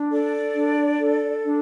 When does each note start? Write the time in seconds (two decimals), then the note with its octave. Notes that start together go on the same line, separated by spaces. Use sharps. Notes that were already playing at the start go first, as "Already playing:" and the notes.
Already playing: D4
0.12 A4 D5
0.55 D4
0.99 A4
1.44 D4